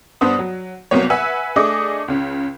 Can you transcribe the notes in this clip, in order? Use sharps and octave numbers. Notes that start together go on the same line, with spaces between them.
G2 B3 D4 C5 D#6
F#3
C2 C3 F#3 A#3 B3 C#5
B4 E5 F#5 G#5 E6
A3 D4 G#4 D#5 D6
C#2 C#3